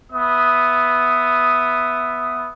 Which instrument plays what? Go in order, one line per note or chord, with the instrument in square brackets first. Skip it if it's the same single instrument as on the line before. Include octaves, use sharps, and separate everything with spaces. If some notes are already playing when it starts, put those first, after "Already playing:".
[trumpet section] B3 E5 D#6